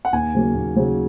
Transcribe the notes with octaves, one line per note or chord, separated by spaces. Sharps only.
F#5
D#2 G#5
C#3 F#3 A#3
D#2
C#3 F#3 A#3